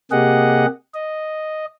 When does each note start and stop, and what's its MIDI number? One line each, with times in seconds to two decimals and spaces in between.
0.12 0.66 48
0.12 0.66 58
0.12 0.66 67
0.12 0.66 68
0.12 0.66 75
0.12 0.66 78
0.94 1.66 75